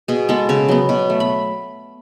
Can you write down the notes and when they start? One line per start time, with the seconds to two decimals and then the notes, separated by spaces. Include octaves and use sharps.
0.08 B2 G#4
0.29 G#3 B3 A4
0.49 C#3 C#5
0.69 F#3 B3
0.89 B2
1.10 A3
1.20 B5